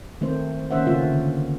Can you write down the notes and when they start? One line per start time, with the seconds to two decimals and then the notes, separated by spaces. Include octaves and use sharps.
0.21 D#3 A3 C4 C5
0.71 D#3 A#3 C#4 C5 E5 F#5
0.87 C#3 A3 F4 E5
1.02 D3